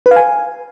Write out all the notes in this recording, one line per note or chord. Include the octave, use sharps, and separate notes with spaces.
B4
F5
G#5